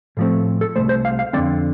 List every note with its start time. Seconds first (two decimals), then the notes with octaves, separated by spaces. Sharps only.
0.17 A2 F3 A3 C4
0.61 A4
0.76 C2 C3 A3 C5
0.89 C5
1.05 F5
1.19 F5
1.33 F2 D3 F3 C4 D5